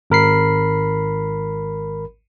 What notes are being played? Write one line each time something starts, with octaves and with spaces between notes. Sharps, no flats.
G#1 A#4 B5 C7